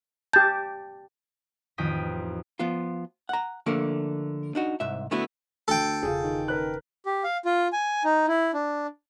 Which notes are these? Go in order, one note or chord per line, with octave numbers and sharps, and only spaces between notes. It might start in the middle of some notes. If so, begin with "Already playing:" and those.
G4 A5 G6
A1 F2 D#3 G5 D#6 B6
F3 B3 F4
F#5 A#5
D3 F3 A3 A#3 A#4
D4 D#4 F#4
C2 G#2 E5
D3 A3 B3 E4 F#4
D2 A4 G5
E1 C#3 F4 G#4
D#3
A#4 B4 F#6
G4
F5
F4
G#5
D#4
E4
D4